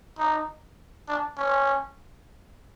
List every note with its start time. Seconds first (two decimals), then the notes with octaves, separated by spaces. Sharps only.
0.19 D#4
1.08 D4
1.38 C#4